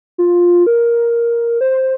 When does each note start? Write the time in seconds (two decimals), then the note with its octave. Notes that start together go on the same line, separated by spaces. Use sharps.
0.18 F4
0.67 A#4
1.61 C5